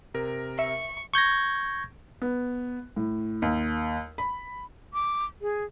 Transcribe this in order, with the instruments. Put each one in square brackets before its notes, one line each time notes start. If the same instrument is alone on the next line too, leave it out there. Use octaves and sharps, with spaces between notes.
[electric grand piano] C3 A#4
[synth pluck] E5 [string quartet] C#6
[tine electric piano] C#6 G6 G#6 A#6
[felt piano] B3
A2
D#2
B5
[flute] D6
G#4